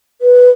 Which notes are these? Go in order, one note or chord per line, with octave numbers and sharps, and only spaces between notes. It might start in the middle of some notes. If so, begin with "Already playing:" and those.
B4